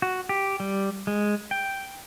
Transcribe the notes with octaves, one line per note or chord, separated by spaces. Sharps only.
F#4
G4
G3
G#3
G5